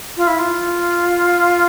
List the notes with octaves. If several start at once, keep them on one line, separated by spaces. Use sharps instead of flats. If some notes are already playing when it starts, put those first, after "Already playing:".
F4
E4
F4